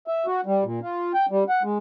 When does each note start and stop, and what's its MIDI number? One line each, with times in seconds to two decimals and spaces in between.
0.07 0.26 76
0.26 0.41 66
0.46 0.64 55
0.64 0.80 46
0.82 1.12 65
1.14 1.26 79
1.31 1.44 55
1.49 1.63 78
1.63 1.78 56